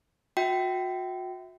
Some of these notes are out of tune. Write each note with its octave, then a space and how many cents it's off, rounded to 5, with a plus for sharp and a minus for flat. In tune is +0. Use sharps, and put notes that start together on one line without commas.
F#4 -35 E5 -10 G5 -30